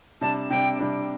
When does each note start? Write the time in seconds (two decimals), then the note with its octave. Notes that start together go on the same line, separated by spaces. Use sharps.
0.21 C3 G3 D4 A5
0.50 C3 G3 D4 G5
0.79 C3 G3 D4